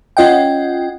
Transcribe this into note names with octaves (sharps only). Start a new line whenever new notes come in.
C#4 F4 D#5 F#5 G5